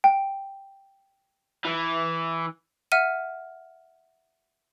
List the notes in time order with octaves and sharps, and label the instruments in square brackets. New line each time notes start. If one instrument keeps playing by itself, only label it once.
[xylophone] G5
[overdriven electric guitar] E3
[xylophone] E5 F#5 F6 D#7